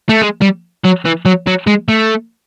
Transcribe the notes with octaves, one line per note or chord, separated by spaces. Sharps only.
A3
G#3
G3
F#3
E3
F#3
F#3
G#3
A3